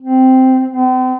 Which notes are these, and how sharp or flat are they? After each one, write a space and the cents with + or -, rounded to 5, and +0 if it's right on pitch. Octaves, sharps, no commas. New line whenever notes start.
C4 -10
C4 -40